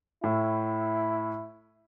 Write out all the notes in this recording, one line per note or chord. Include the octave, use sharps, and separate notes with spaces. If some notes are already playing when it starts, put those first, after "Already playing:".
A2 E4